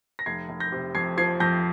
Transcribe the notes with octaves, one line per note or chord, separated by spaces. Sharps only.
A#6
F1 G#6 C7
F1
G6 A#6
C3
F2 G#6 C7
F3 G#6 C7
F2 G6 A#6